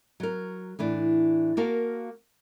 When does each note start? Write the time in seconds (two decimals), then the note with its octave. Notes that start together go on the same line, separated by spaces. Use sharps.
0.20 F#3 A#4
0.79 A2 E3 D4
1.57 A#3 F#4 A#4 F5 A5